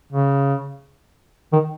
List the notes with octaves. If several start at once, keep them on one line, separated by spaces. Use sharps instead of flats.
C#3
D#3